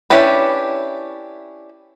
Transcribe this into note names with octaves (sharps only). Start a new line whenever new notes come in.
C#4 D4 E4 G4 B4